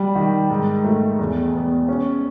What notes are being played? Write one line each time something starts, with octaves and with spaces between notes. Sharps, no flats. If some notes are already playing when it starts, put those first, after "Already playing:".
Already playing: G3
D#3
G#2
A3
E2
B3
C#4